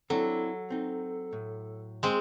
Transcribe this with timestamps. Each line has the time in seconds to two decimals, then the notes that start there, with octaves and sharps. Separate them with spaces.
0.10 F#3 C4 D4 E4 A4
0.70 C4 D#4
1.33 A2
2.03 G#3 C4